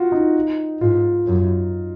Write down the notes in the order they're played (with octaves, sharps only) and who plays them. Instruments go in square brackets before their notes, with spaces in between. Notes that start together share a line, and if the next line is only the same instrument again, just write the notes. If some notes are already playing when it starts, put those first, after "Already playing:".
Already playing: [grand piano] F4 F#4
D#4
[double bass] G#2 [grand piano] F4
[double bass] F#2